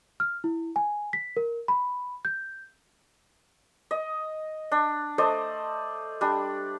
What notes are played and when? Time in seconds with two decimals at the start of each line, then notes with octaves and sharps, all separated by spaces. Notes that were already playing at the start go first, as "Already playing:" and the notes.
0.20 F6
0.44 E4
0.76 G#5
1.13 B6
1.37 A#4
1.68 B5
2.25 G6
3.91 D#5
4.72 D4
5.18 A3 C5 D5 D#5
6.21 G3 D4